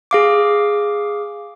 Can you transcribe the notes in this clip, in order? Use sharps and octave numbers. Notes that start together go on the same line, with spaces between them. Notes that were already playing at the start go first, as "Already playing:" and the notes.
G#4 F5 D6